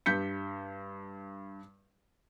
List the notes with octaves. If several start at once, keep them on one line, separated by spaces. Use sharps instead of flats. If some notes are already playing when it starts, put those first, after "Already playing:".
G2 G6 B6 C#7